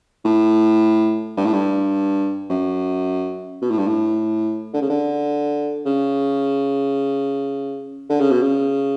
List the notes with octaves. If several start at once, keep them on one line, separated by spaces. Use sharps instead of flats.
A2
G2
A2
G2
F#2
B2
A2
G2
A2
D3
C#3
D3
C#3
D3
C#3
B2
C#3